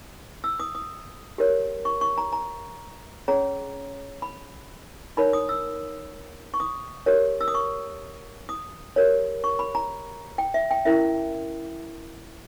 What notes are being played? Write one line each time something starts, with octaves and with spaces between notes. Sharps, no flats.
E6
D#6
D#6
G4 A#4 C#5
C#6
C#6
A#5
A#5
C#4 G#4 C#5 A#5
B5
D#4 A#4 C#5 B5
D#6
E6
C#6
D#6
G4 A#4 C#5
E6
D#6
C#6
D#6
G4 A#4 C#5
C#6
B5
A#5
G5
E5
G5
C#4 E4 A#4 E5